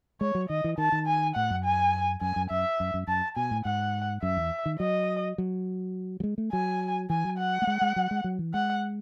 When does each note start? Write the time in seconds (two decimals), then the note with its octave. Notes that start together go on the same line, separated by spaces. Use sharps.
0.21 G#3 C#5
0.35 F#3
0.50 D#3 D#5
0.64 E3
0.78 D#3 A5
0.92 D#3
1.07 G#5
1.35 A2 F#5
1.50 F#2
1.64 G#5
2.21 F#2 G#5
2.36 F#2
2.50 F#2 E5
2.80 F#2
2.94 F#2
3.07 F#2 A5
3.36 B2 G#5
3.51 A2
3.65 G#2 F#5
4.23 F#2 E5
4.37 E2
4.66 D#3
4.80 F#3 D#5
5.38 F#3
6.20 F#3
6.24 G#3
6.38 A3
6.52 F#3 G#5
7.10 E3 G#5
7.25 F#3
7.39 F#5
7.62 A3
7.67 G#3
7.81 G#3
7.96 F#3
8.11 G#3
8.24 F#3
8.39 E3
8.54 G#3 F#5